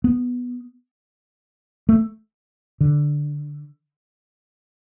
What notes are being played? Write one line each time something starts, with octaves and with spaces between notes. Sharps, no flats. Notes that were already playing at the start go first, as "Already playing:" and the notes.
B3
A3
D3